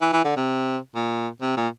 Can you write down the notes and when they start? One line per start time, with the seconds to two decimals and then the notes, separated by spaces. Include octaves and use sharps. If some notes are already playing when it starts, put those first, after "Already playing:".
0.01 E3
0.12 E3
0.25 D3
0.37 C3
0.95 A#2
1.41 C3
1.57 A#2